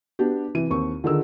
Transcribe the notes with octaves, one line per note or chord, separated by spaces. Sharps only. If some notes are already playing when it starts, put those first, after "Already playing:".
B3 D4 G4
C3 E3 D#7
D#2 C4 C#6
D3 D#3 F4 G#4 A#4 E6